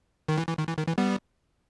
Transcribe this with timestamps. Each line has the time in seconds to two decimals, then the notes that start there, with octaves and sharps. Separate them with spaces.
0.28 D#3
0.38 E3
0.48 E3
0.58 D#3
0.68 E3
0.78 D#3
0.88 E3
0.98 G3 B3